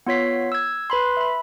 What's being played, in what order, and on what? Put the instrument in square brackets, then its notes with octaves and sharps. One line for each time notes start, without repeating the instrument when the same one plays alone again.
[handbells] B3 F4 C#5 B6 C7
E6 G#6
B4 B5 C6
E5 B5